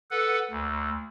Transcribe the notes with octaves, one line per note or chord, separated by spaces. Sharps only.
A4 B4 F#5
D2